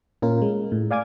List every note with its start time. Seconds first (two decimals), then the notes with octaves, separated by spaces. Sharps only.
0.22 A#2 C#4 F4 A#4
0.42 G#3
0.72 A2
0.91 D5 F5 G#5 D6 G#6